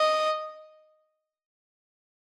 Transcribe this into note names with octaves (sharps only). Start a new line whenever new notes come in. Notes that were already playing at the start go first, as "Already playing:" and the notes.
Already playing: D#5